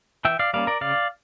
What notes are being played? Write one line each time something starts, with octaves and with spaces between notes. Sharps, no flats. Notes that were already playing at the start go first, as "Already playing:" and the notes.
E3 E5 G5
D5 F5
G3 A#3 C#4 D5 F5
A#4 D5
C#3 D5 F5